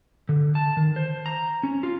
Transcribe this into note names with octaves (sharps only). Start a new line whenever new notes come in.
D3
A5
D#3
C5
A#5
C#4
F4